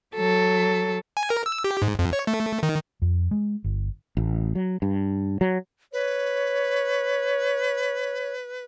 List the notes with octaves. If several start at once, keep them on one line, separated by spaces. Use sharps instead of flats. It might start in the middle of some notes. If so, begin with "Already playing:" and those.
F#3 A4
G#5
A#4
E6
G4
G#2
F2
C#5
A3
D#3
F2
G#3
G1
A1
F#3
G2
F#3
B4 C#5